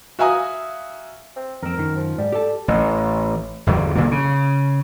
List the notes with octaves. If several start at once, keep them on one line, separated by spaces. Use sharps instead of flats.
F#4 E5 F5 G#5 A#5 D#6
C4
F2 C4 A#4
F#2 D#3
F3
G#2 G3
G4 A4 A5
A1
G1 E2 F#3 G3
B1 A#2 D3 A#3
C#3